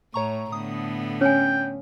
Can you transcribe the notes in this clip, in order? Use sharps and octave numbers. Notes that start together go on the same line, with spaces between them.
A2 C#5 A#5 C#6
A2 D3 B3 D#6
C#4 C#5 G5 G#5